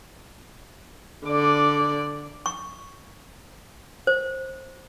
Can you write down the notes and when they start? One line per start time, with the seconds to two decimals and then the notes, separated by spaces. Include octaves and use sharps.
1.27 D3 D5
2.46 C#6
4.07 C5